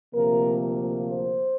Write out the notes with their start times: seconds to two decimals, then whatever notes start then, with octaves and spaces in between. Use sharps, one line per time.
0.13 D2 C3 F3 A#3 A#4
1.08 C5